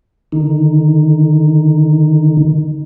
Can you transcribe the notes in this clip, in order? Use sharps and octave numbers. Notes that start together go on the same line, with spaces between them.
D3 D#3 D#4